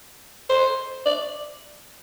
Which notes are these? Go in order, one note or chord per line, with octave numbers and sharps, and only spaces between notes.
C5
D5